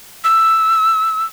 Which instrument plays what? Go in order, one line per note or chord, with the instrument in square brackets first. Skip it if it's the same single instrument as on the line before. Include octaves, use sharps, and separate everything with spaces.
[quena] E6